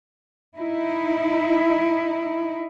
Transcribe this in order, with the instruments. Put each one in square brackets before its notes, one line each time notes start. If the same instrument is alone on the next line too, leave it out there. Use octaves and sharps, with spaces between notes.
[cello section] D#4 E4